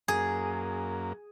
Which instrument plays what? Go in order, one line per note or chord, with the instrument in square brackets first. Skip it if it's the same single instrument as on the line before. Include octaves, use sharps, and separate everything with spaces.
[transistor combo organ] F#2 A#3 [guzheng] G#4